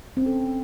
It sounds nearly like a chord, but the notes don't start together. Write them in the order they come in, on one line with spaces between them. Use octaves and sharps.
C4 C#4 A4